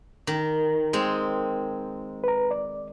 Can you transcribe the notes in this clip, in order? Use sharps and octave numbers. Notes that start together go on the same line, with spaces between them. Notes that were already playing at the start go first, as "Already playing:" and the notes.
D#3
G#3 C4
B4 A#5
D5